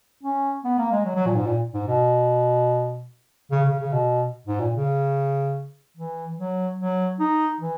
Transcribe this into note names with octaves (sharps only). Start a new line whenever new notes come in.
C#4
B3
A#3
G#3
F#3
F#3
A#2
G#2
A#2
G#2
B2
C#3
C#3
C#3
B2
G#2
A#2
C#3
E3
F#3
F#3
D#4
E3